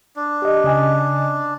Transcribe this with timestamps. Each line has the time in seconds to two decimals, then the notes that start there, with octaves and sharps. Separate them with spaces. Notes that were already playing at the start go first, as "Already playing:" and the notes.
0.16 D4
0.42 G4 D#5
0.64 C#3 D#5 G#5